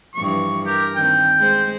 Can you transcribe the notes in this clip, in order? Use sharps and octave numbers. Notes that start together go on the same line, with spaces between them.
G2 E3 F3 C#6
G4 A#4
D#3 C4 G5
G#3 C5